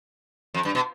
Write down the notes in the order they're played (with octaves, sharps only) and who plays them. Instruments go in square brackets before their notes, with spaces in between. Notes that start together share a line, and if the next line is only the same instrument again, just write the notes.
[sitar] F2
G2
B2